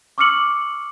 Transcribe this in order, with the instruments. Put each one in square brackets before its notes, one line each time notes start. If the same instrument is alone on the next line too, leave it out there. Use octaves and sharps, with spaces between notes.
[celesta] C#6 D6 E6 F6 C#7 F#7